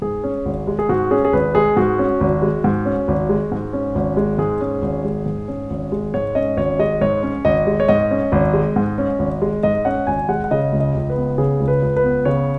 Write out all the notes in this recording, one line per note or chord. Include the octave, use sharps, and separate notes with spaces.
G#2 G#4
C#4
G#1
G#3
G#4
G#2 F#4
C#4 G#4
G#4
G#1 B4
G#3 G#4
G#2 F#4
C#4
G#1
G#3
G#2
C#4
G#1
G#3
G#2
C#4
G#1
G#3
G#2 G#4
C#4
G#1
G#3
G#2
C#4
G#1
G#3
G#2 C#5
C#4 D#5
G#1 C#5
G#3 D#5
G#2 C#5
C#4
G#1 D#5
G#3
C#5
G#2 D#5
C#4
G#1
G#3
G#2
C#4
G#1
G#3
G#2 D#5
C#4 F#5
G#1 G#5
G#3 F#5
F#5
C#3 D#5
C#2
D#5
C#2
B4
B3
C#3 G#4
C#2
B4
C#2
B4
B3
C#3 C#5